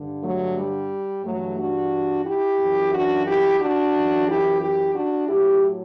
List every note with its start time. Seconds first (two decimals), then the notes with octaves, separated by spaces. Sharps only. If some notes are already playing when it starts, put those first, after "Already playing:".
Already playing: G2 D3
0.22 F#3 A3
0.56 G3
1.24 G2 E3 F#3 A3
1.57 D4 F#4
2.25 E4 G4
2.58 F#2 E3
2.92 D4 F#4
3.25 E4 G4
3.59 D4 F#4
3.93 F#2 E3
4.26 E4 G4
4.60 E4 G4
4.93 D4 F#4
5.27 A2 F#3 E4 G4